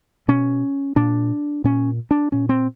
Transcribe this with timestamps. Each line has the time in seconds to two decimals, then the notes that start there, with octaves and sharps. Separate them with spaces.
0.28 B2 C#4
0.96 A#2 D4
1.64 A#2 C#4
2.11 D4
2.32 A#2 C#4
2.49 C4